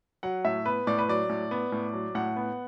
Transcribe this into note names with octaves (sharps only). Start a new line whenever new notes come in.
F#3 F#5
A2 E5
B3 B4
A2 D5
B4
F#3 D5
A2
B3
A2
F#3
A2 F#5
B3